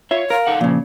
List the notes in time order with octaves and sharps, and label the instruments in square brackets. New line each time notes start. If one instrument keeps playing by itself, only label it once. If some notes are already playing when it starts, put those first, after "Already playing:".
[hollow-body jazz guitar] F4 E5 [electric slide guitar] C#5
[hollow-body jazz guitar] A#4 [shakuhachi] F5
[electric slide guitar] D#4 A4 F#5
[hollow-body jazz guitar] A#2 C#3 [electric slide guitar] F3